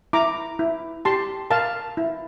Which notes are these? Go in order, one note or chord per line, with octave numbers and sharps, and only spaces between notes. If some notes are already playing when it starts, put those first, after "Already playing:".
E4 A#5 D6
E4
G4 A5 C6
A#4 F5 A5
E4